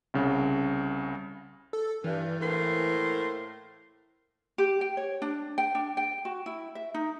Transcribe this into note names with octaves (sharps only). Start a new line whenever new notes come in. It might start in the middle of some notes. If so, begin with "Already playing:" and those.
C2 C#3
A4
G2 E3
A2 A#3 C5
G4
G5
C#5
D4
G5
D4
G5
F#4
E4
E5
D#4